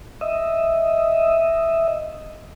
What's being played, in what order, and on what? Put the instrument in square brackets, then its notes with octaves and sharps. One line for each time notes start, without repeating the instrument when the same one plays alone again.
[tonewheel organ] D#5 E5